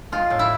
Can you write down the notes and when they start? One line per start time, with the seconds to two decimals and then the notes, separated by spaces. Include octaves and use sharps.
0.12 G#3 F4
0.30 A2
0.39 E4